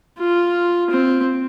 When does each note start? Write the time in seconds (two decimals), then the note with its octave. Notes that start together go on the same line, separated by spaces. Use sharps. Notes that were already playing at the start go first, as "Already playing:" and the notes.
0.18 F4
0.90 C4